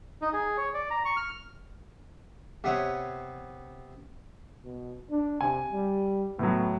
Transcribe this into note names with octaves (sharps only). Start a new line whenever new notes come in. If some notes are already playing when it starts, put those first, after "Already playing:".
D#4
G#4
C#5
D5
A#5
C#6
F6
C3 B3 C#5
B2
D4
C3 G#5
G3
A2 F#3 B3